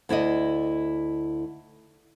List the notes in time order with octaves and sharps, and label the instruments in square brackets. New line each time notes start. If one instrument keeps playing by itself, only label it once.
[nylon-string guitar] D2 E4 D5 D#5